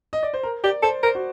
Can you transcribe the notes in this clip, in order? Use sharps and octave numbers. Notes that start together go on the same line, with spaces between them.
D#5
D5
C5
A#4
G4 D5
A4 C5
A#4 C5
F#4